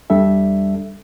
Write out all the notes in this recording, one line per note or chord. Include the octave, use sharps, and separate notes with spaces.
E2 G3 D4 A4 E5